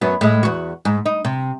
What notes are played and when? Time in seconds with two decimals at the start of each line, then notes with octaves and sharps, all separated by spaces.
0.01 F#2 F#3 B3
0.21 A2 G#3
0.43 E2 F#4
0.85 G#2
1.06 D#4
1.25 C3